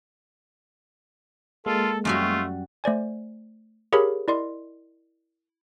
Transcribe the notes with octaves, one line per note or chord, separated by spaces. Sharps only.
G#3 A#3 F4 A4
F#2 G3 A3 F4 F#4
A3 C5 D5 G#5
G4 G#4 A#4 C#5 F5 B5
E4 A#4 D5 D#5 C6